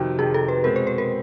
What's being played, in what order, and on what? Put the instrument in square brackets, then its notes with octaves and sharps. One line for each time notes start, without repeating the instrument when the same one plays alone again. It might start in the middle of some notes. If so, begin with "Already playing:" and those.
Already playing: [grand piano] F2 C3 D#3 [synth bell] F#4
[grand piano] F2 C3 D#3 [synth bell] G#4
[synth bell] A4
B4
[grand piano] B2 G#3 C4 [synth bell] A#4
[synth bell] C5
B4
A#4